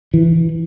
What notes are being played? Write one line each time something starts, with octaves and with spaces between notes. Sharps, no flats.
E3